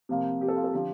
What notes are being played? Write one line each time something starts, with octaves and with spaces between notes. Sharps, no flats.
C3 F3 A#3
G4
A4
F4
A4
D3 F3 G4